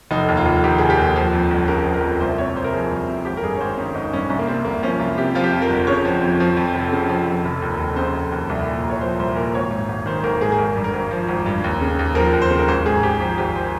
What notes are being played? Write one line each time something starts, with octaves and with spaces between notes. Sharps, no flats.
F1 D#4
D#2
F4
F1
D#3 G4
F1 G#4
G4
D#2
F3
F2
G1
C#3 A#4
F3
A#4
F2
C2 C5
C3 C#5
C2 C5
A#4
F3 G#4
C2
C3
G#1 G4
A#4
G2 G#4
C#5
G#1 C5
D#3 C#4
G#1 D#4
G2 C#4
C2 C#4
A#3
C3 C4
C2 A#3
F3 C#4
C2 F4
C3 G4
F3 F4
G4
F2 F4
A#4
G1
C#3 C#5
F3
F2
F3
F2
F1
C#3
F3
F2
F1
D#2
F1
C#3 C5
F1
D#2
C2
A#2
C2
C#5
F3 C5
C2 C5
A#2 A#4
G#1 C#5
G#2
G#1
D#3 C5
G#1 A#4
G#2 G#4
G#4
G#1 A#4
G2
A#4
G#1
F3
G#1
G2
D#2
C#3
D#2
F3 A#4
D#2
C5
C#3
A#4
G#1 C5
G#2 G#4
G#1 G4
F3 G4
G#1 G4
C5